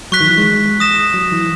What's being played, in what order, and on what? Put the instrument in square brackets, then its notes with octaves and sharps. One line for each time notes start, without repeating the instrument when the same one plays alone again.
[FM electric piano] F#3 [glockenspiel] C#6 F#6 B6
[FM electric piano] D#3
E3
G#3
[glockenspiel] D#6 A#6 E7
[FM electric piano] F#3
E3